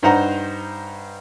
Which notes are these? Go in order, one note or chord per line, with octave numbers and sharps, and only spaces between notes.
G2 D#4 C5 F#5 A#5